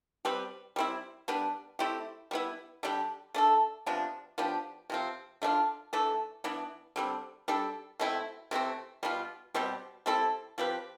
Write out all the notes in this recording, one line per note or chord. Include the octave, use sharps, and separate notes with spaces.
G3 C4 G4 B4
G3 C4 E4
G3 B3 D4
A3 C4 E4 G4
G3 B3 E4
D3 G3 D4 G4
A3 D4 A4
C3 F3 B3 D4
F3 B3 D4 G4
C3 F3 C4
D3 A3 D4 F4
E3 A3 D4 A4
E3 B3 D4
D3 G3 C4
G3 D4 A4
B2 A3 C4 E4
C3 E3 A3 C4
B2 G3 B3 F4
B2 G3 C4 G4
G3 C4 E4 A4
F3 C4 G4 B4